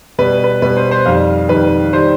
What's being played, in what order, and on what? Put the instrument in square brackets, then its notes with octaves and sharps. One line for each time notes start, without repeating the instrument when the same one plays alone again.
[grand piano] B2 G3 B4
B4
B2 B4
G3
C5
C5
F2 D#3 G3 F5
F2 D#3 G3 B4
D#3 G3 C5